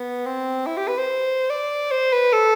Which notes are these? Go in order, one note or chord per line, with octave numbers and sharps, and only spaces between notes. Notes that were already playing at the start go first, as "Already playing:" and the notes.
Already playing: B3
C4
E4
G4
B4
C5
D5
C5
B4
A4